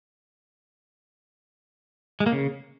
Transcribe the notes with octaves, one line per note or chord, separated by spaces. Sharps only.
G#3
A#3
C#3